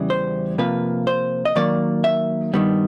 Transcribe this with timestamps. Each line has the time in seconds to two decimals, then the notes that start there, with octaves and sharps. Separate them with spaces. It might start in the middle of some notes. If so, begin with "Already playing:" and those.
Already playing: E2 C#3 E3 G3
0.10 C5
0.58 C3 F3 A#3 B4
1.07 C5
1.45 D#5
1.56 D#3 F#3 A#3 D5
2.04 E5
2.54 G2 D#3 G3 B3